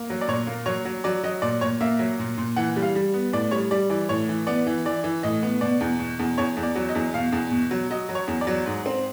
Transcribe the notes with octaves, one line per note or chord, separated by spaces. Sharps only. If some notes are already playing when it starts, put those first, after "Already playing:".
Already playing: A#3
F#3
D5
A#2 C#5
A#3
F#3 C#5
F#3
F#3 D5
F#3 D#5
A#2 D5
A#2 C#5
A#3 E5
F#3
A#2
A#2
E3 F#5
G3
F5
G3
B3
A2 D5
G3 C#5
G3 D5
E3 D5
A2 C#5
E3
B3 D5
E3
E3 D5
E3
A2 D#5
B3
B2 D5
E2
B2
E2
E2 C#5
E2
D5
F#3
D#5
E2
B2 F5
E2
B2
F#3
F#3 D#5
F#3
C#5
E2
D5
F#3
G#2
C4